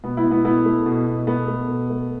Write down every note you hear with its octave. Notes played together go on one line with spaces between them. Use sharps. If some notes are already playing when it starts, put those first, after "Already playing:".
B2 B3
B3 E4
B2
B3 E4
A3 B3 E4
A3
B2
B2
A3 B3
A3
B2
A3